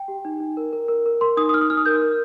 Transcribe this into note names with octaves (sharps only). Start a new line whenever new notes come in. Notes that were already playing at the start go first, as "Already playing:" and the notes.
Already playing: G5
G4
D#4
D#4
A#4
A#4
A#4
A#4
A#4 C6
D#4 D#6
D#6
D#4 F6
D#6
D#4 F6
D#6
A#4 G6
A#4